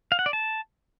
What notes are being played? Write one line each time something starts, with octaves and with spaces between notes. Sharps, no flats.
F5
F#5
D5
A5